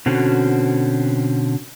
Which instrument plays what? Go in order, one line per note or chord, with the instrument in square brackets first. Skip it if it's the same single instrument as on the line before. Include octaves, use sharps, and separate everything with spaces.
[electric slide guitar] B2 D3 C4 C#4 F#4